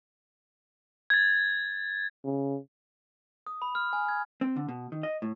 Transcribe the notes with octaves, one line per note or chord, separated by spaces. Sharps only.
G#6 A6
C#3
D#6
B5
F6
G#5
G#6
C4
D3
B2
D#3
D#5
A2